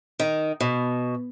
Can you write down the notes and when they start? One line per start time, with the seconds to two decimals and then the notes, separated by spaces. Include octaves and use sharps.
0.20 D#3
0.60 B2